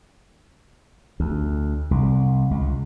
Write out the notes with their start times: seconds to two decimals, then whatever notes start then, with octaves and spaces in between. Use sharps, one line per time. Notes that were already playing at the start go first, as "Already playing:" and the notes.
1.20 D2
1.91 C2
2.51 C#2